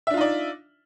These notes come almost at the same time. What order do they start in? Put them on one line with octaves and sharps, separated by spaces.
E5 D4 F4 D#4 D5